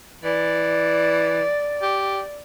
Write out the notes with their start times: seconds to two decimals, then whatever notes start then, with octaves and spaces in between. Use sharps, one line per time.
0.24 E3 D5
1.82 G4